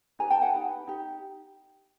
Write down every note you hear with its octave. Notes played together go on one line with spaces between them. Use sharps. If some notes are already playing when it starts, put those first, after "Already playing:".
D#4 G4 B4 G#5 A#5
G5 A5
F#5 G#5
D#4 G4 B4
D#4 G4